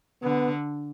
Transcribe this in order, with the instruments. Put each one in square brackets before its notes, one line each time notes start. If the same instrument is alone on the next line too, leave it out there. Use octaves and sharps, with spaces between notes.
[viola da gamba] D3 [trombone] B3